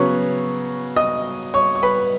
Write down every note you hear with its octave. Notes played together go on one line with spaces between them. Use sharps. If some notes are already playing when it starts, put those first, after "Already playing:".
Already playing: C#3 F#3 B3 C#5 C#6
D#5 D#6
C#5 C#6
C#6
B4 B5